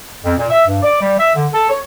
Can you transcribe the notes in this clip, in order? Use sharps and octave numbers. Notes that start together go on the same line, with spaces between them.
F2
A#2
E5
G2
D5
G3
E5
D3
A4
C#5